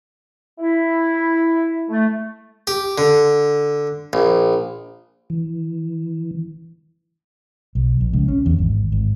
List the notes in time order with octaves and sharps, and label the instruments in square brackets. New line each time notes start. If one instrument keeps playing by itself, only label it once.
[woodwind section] E4
A3
[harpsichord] G4
D3
A#1
[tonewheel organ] E3
[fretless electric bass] B1
A#1
C#2
C#4
E2
G#1
G#1